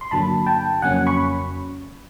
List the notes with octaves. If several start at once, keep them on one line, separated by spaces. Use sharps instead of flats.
C6
G2 D3 F#3 A#3 A5 B5
G5 A5
F2 C#3 F#3 A#3 C#4 F#5 G#5
B5 C#6